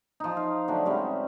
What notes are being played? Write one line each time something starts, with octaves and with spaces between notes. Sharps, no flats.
F3 D#4
F5
D3 F#3 A3 D4
C3 G3 G#3 C#4